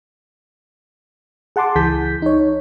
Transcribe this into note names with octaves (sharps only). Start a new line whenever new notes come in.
G#4 F#5 A5 C6 D6
C#2 E3 G#4 A5 G6 B6
D#4 C#5